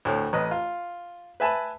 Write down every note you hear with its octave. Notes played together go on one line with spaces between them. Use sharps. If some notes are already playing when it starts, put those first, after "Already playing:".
D2 A2
A1 B4 D#5
F4
B4 E5 G#5 A5 B5